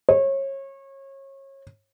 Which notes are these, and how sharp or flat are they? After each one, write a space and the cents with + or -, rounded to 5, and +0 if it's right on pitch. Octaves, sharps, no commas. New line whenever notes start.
C#5 -30